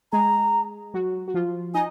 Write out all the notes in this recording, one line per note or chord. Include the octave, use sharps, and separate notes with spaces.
G#3 G#4 A#5
F#3 F#4
F#4
F3 F4
D#4 D#5 G#5